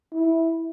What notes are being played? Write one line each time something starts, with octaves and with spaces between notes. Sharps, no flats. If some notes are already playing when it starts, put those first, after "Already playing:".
E4